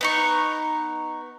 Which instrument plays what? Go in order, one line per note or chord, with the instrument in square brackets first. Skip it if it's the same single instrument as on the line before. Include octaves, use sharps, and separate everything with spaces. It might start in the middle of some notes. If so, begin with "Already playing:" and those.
[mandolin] B3 D#4 C#6